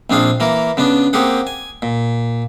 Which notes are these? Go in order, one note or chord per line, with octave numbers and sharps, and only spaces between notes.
A#1 C4 D4 G#4 F5
E3 A#3 A#4
C#3 B3 D4
A#3 C4 G4 G#4 F#5
G#5
A#2